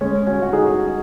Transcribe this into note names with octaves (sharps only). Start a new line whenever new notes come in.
G#3 C#4
C#4 F#4
F#4
D#4 G#4